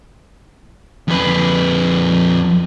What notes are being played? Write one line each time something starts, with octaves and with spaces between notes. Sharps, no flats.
F2 B4